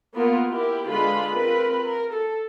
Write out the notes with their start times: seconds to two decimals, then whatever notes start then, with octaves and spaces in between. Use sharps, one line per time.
0.14 A#3 B3 F4 A#4
0.49 E4 G4 A#4
0.89 D3 G#3 F4 B4 B5
1.32 C4 F4 A#4 B4 B5
1.82 A#4
2.13 A4